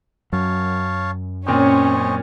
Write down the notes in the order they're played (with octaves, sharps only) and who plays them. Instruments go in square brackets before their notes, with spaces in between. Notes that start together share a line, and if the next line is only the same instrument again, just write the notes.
[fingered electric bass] F#2 F#3 [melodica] C#5 F5 A5
[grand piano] A#2 C4 [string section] C#4 [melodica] C5 C#5 D#5